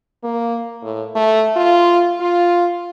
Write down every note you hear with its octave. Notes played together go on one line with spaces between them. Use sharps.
A#3
A2
A3
F4
F4